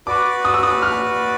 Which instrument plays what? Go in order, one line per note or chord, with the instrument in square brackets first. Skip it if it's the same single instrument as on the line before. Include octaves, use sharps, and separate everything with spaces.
[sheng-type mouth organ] F#4 B4 D5 [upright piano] D6
[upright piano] D#6
E6
D#6
F6